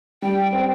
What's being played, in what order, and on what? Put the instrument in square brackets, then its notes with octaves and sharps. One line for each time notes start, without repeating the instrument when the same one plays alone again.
[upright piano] G3 [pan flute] G5
[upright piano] C4